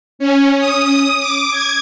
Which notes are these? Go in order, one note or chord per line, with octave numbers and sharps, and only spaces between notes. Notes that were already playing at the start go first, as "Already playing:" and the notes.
C#4
D#6
D6
G#6